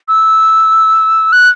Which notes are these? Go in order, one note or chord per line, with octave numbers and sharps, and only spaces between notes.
E6
F#6